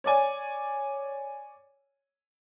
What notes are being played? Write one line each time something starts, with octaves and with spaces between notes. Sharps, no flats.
C#5 D5 G#5